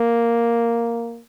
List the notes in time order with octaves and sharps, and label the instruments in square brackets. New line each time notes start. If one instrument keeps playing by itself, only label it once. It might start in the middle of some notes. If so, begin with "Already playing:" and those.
Already playing: [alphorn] A#3